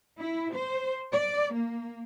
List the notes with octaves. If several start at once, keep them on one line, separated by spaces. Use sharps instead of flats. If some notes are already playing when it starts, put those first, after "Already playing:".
E4
C5
D5
A#3